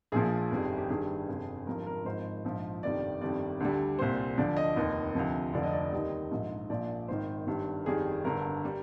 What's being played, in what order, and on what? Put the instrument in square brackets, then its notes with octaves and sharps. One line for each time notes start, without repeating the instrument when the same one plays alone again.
[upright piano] A#1 A#2 F3 G#4
G1 F2 D#3 G3
G4
G1 G2 D#3 G3 G#4
G1 F2 C3
G#1 G2 F3 A#4
A#4
G#1 G#2 F3 C5
A#1 G#2 F3
G1 F2 C3 D#3 G3 D5
G1 F2 D#3 G3 D5
D2 D3 G3
C2 A#2 G3 C5
D2 D3 F3 D5
D#5
F1 D#2 D#3
D2 C3 F3
F1 F2 D3 F3 D5
D#5
D5
D#2 D#3 G3 D#5
A#1 G#2 F3
A#1 A#2 F3 D5
G#1 G#2 D#3 C5
G1 G2 D#3 G3
G1 F2 D#3 G3 G#4
G1 G2 D3 A#4
G3